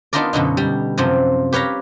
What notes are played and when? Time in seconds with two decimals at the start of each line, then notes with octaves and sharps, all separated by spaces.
0.13 B3 D4 D#4 F4 A#4 D5
0.33 F#2 B2 D3 D#4
0.57 G3
0.98 F#2 C3 F3
1.53 G4 B4 C#5 F5 A#5